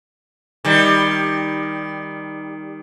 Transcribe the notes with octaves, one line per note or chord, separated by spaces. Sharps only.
D#3 G3